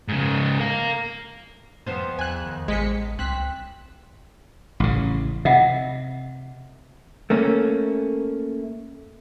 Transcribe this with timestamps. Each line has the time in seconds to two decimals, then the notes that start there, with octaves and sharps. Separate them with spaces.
0.08 G#2 C#3
0.60 A#4 F5
1.87 F2 B3 C5
2.19 E2 G#5 F#6
2.47 D#3
2.68 A1 G#3 B6 C#7
3.19 C#2 C4 F#6 B6
4.80 A1 C#3
5.45 C3 D#5 E5 F#5
7.30 A3 A#3 C#4